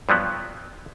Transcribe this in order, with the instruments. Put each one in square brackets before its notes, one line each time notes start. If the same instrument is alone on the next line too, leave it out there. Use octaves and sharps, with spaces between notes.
[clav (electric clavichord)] G2 F3 F#3 B3